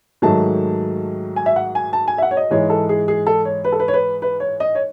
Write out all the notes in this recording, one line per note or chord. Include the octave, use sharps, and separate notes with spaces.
G#2 D#3 F#3 A3 A5
G#5
E5
F#5
G#5
A5
G#5
E5
F#5
C#5
D#5
G#2 E3 G#3 C#5
A4
G#4
G#4
A4
C#5
B4
A4
B4
C#5
B4
B4
C#5
D#5
C#5